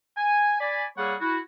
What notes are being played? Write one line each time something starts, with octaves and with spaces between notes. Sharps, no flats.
G#5
D5 G#5 B5
G3 A#3 G#4 A#4 C#5 F#5
E4 F#4